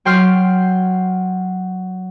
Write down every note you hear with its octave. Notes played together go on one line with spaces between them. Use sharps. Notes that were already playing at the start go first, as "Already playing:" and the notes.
F#3 G5 C6 F6